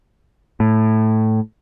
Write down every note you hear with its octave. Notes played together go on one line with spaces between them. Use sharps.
A2